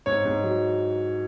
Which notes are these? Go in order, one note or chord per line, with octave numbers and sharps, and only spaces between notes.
G#2 C#5
G#2
F#3